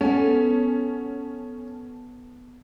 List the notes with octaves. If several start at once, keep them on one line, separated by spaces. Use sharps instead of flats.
B3 C#4 A4 G#5